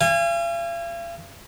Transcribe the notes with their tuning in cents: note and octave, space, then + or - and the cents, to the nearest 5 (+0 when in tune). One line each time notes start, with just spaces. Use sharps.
F5 -45 G#5 -30